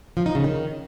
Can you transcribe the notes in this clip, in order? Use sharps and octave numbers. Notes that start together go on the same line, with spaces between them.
F3
D#4
C#3
D#3